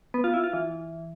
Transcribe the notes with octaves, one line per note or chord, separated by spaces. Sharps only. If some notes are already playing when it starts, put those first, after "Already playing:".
B3
F4
E4
F4
E3